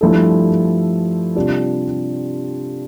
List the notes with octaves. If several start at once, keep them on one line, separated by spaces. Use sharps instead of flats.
G2 F3 A3 E4 A4
C3 G3 D4 F4